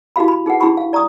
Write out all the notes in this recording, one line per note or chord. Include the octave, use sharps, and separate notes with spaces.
E4 F#4 G4 F5 B5
B5
D#4 G#4 B4 F#5
D4 E4 G4 G#4 B5 C#6
F5
D5 A#5 C#6 D#6